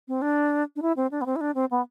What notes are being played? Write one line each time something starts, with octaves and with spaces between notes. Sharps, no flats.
C4
D4
D4
E4
C4
D4
B3
C4
E4
D4
C4
B3